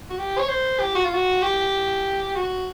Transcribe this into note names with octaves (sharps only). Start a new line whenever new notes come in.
F#4
G4
C#5
C5
G4
F#4
F4
F#4
G4
F#4